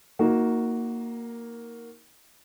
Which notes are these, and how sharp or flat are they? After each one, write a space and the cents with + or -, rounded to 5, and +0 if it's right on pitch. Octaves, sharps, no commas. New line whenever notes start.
A#3 +0 D#4 +30 F#4 +0